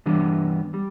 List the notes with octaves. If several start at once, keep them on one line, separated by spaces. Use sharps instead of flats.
G2 E3 G3 B3 D4
G3